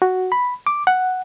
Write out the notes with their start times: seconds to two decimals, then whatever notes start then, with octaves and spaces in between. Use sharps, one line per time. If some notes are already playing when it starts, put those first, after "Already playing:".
0.02 F#4
0.32 B5
0.67 D6
0.87 F#5